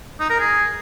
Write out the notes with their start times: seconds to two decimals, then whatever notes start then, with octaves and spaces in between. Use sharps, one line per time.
0.20 D#4
0.30 A#4
0.39 G#4